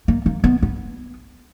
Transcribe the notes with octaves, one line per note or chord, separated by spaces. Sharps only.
A#3
A#3
B3
B3